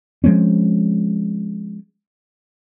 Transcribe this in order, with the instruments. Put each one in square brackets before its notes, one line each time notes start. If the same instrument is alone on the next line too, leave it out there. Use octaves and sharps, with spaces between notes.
[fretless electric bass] F3 G#3 C4 C#4